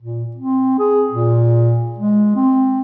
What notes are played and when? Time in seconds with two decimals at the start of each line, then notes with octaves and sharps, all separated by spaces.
0.02 A#2
0.36 C4
0.79 G#4
1.12 A#2
1.99 G#3
2.36 C4